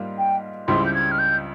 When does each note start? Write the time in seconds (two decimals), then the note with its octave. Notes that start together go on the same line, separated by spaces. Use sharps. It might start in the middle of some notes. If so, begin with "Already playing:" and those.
Already playing: G#2 G3 A#3 F4
0.18 G5
0.68 C#2 C#3 G3 C4 E4 C6
0.86 G6
0.94 G#6
1.12 F6
1.19 G6